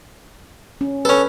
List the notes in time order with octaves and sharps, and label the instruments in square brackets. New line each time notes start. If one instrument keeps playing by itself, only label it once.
[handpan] C#4
[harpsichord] C#4 A4 [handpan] B4